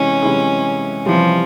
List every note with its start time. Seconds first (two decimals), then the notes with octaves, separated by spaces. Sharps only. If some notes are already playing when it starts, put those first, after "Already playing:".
Already playing: C3 E3 G#3 C#4 E4
0.22 C3 E3 G#3 E4 G#4
1.06 C3 E3 F3 G3